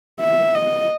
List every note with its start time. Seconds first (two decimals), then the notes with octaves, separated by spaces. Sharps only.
0.20 E5
0.55 D#5